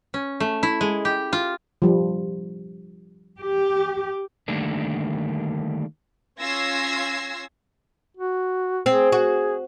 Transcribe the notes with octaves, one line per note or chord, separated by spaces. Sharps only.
C#4
A3
E4
G#3
G4
F4
F3 G3
G4
D3 D#3 G3 A3 A#3 D4
C#4 F4 E6 G#6 A#6 C7
F#4
C4 G#4
F#4